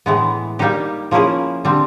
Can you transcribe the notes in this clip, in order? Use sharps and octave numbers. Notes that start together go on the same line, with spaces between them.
A2 E3 G#3 B3
G3 A#3 D#4 G4
F3 A#3 C#4 E4 G#4
D3 G3 C4